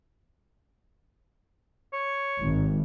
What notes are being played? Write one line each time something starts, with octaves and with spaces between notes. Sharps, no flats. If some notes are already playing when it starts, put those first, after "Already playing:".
C#5
G#1